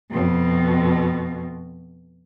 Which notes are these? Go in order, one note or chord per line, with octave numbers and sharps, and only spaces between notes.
F2 B2